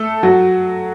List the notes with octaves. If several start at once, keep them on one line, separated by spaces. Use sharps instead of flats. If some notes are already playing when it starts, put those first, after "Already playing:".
Already playing: A3 A4
F#3 F#4